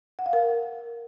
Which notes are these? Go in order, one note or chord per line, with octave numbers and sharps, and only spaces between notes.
F#5
F5
A#4